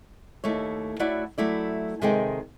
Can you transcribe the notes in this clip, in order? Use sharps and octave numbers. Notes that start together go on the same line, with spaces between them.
D#2 A3 E4 C#5
A3 E4 F#4 C#5 D5 F#5
F#3 A3 E4 D5
C3 D#3 G#3 A4 G5 G#5